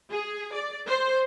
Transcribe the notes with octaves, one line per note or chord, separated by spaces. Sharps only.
G#4
D5
C5